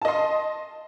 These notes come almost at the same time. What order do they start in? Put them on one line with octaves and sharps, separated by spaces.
A5 D#5 C6